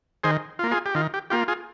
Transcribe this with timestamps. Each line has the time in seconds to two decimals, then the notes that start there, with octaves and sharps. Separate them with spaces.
0.24 D#3 G#4 C5
0.59 F4
0.64 A#3
0.71 F4 G#4
0.86 G4
0.95 D#3 F4
1.14 G4
1.30 A#3 F4 G4
1.48 F4 G#4